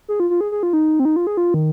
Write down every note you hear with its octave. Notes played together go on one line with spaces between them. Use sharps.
G#4
F4
F4
G#4
G#4
F4
D#4
C4
D#4
F4
G#4
F4
D#3